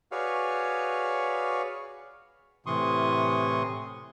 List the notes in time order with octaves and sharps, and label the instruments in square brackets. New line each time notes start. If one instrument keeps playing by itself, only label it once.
[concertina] F#4 G#4 B4 C#5 D5 F5
[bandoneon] A2 C3 E3 C6 C#6 D#6